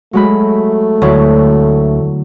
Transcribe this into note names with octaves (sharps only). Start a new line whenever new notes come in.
F#3 G#3 A3 B5
D2 F#3 E4 C#5